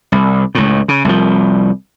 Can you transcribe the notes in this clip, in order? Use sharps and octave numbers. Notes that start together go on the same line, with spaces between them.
C2
C#2 A2
C#3
C2 F3